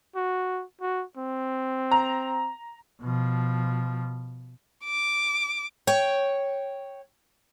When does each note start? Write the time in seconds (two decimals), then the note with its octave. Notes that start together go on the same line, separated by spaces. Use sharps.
0.16 F#4
0.81 F#4
1.17 C4
1.91 A#5
3.01 B2 F3
4.85 D6
5.87 C#5 G5